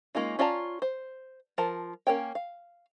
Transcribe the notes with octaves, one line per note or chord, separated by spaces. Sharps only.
G#3 A#3 C#4 D#4 F4
C#4 F4 D5 A5 A#5
C5
F3 A#4 A5
A#3 C#4 A#4 C#5 G5
F5